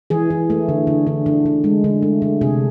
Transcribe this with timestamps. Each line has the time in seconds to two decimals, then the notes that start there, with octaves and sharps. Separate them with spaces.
0.10 E3 G#4
0.30 E3
0.50 A3
0.69 D3
0.87 D3
1.07 D3
1.26 D3
1.46 D3
1.64 G#3
1.84 D3
2.02 A3
2.22 D3
2.41 C3 G#4